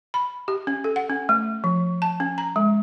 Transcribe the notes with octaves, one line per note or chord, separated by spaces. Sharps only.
B5
G4
C#4
A4
F#5
C#4
A3
F3
A5
C#4
A#5
G#3